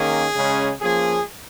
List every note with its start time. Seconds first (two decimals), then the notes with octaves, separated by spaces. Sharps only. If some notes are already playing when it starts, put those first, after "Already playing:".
Already playing: D#3 A#3 C#4 G#4
0.36 C#3 G#3 C#4
0.81 F3 A#3 C#4 G#4